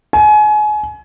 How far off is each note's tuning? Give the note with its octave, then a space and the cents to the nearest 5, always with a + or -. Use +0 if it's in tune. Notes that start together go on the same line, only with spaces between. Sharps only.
G#5 +30